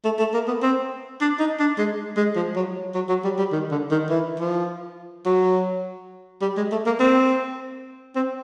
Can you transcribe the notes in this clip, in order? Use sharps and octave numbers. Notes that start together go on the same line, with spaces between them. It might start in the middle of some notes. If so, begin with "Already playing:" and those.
A3
A3
A#3
B3
C4
D4
D#4
D4
G#3
G#3
F3
F#3
F#3
F#3
G3
G3
D#3
D3
D#3
E3
F3
F#3
G3
G#3
A3
A#3
C4
C4